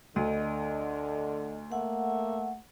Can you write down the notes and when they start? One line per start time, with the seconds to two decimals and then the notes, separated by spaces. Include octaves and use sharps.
0.16 D2 D3 D#5
1.72 A3 A#3 F#5